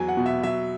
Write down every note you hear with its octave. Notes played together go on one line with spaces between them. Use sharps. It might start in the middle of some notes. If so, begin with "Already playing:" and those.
Already playing: E2 F#3 G#5
F#5
B2
E5
F#3 E5